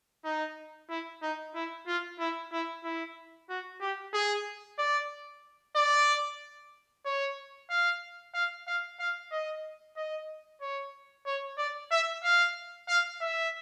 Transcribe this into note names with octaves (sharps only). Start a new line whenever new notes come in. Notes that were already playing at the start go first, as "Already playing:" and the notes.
D#4
E4
D#4
E4
F4
E4
E4
E4
F#4
G4
G#4
D5
D5
C#5
F5
F5
F5
F5
D#5
D#5
C#5
C#5
D5
E5
F5
F5
E5